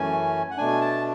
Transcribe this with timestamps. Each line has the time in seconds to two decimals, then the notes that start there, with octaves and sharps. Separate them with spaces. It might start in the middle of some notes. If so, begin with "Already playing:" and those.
Already playing: F#2 E3 A3 C#4 G#5
0.51 F#5
0.57 B2 A3 D4 G#5
0.81 A5